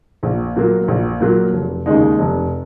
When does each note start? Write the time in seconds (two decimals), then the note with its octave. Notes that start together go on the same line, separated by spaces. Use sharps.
0.23 A#1
0.56 A#2 F#3 A#3
0.88 A#1
1.20 A#2 F#3 A#3
1.53 F1
1.86 D#2 C#3 G#3 D#4
2.19 F1